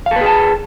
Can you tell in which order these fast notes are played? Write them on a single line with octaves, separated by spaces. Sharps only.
F5 A4 B4 G#4 A5